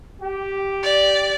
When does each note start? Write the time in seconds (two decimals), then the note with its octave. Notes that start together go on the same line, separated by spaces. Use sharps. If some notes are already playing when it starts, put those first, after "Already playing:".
0.21 G4
0.83 D5